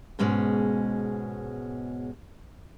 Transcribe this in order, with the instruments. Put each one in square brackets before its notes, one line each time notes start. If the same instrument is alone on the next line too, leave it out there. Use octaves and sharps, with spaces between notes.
[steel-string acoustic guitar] G#2 B2 G#3 C#4